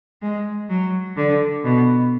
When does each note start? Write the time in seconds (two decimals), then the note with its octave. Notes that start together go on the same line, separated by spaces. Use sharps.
0.22 G#3
0.69 F#3
1.16 D3
1.64 B2